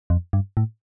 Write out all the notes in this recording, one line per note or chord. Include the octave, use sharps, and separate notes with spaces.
F2
G2
A2